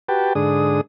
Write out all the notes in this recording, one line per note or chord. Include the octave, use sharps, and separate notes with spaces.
F#4 G4 B4 G5 A5
G#2 D3 D4 G#4 D#6